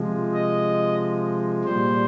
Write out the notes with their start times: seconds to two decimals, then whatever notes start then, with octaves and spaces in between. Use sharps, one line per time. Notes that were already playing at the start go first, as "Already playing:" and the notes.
Already playing: C3 F3 G#3
0.34 D#5
1.64 A#2 G3 C5